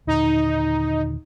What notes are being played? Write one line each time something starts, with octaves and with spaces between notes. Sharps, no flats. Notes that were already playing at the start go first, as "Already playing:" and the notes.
D#2 A#2 D3 D#4